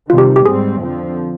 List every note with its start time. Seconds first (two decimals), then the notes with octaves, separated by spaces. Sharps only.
0.09 C3 D#3 G3 F4
0.18 G4
0.36 G4
0.46 G#2 G3 C4 G#4
0.81 F2 D3 F3 C4